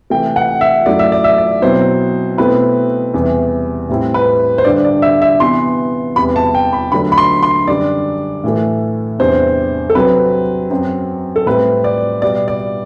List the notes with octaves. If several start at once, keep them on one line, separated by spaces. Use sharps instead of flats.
C3 E3 A3 G5
F#5
E5
F#2 F#3 A3 E4 D5
E5
D5
E5
D5
B2 F#3 C4 E4 C5
B2 A3 C4 E4 B4
E2 C3 E3 G3
A2 G3 C4 E4
B4
C5
G2 D3 G3 D4 D5
D5
E5
E5
C3 E3 B3 C6
E2 C3 G3 B5
A5
G5
B5
D3 F#3 A3 D4 B5
B5
C6
C6
F#2 D3 G3 D4 D5
A2 E3 A3
E2 C3 G3 D4 C5
A4
C3 F#3 C4 B4
F#2 F#3 C4
A4
A2 G3 C4 B4
D5
B2 G3 B3 D5
D5